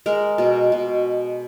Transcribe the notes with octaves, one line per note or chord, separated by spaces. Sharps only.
G#3 A#4
B2
B2